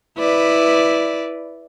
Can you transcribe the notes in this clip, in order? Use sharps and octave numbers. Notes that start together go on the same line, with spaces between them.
E4 B4 D5